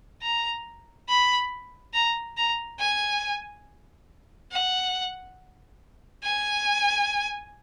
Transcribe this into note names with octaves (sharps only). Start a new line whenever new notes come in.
A#5
B5
A#5
A#5
G#5
F#5
G#5